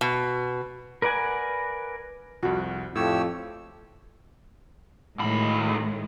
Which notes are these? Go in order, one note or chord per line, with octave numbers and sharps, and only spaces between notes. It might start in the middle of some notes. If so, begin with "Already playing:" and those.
B2
A#4 B4 D5 F#5 G#5
C2 F2 F#4
F2 A2 G4 C#5 E6
D2 A2 D#3 G#3 B5